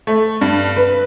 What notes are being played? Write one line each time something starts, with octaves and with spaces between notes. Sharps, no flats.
A3
G2
B4